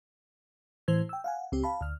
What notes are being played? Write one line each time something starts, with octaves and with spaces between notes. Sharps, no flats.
A2 E3 C5 G#6
G5 E6
F5 F#5 G#5
C#2 C4 G4
F5 A5 B5
D2 F6